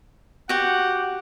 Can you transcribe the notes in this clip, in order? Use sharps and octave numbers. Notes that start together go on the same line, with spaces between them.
F#4 G4 F#5